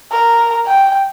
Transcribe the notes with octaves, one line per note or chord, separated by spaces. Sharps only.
A#4
G5